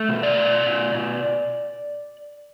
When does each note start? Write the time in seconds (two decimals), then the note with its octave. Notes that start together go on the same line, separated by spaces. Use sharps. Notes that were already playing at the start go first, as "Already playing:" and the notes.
Already playing: A3
0.09 B2
0.23 D5
0.37 B2
0.66 B2
0.95 B2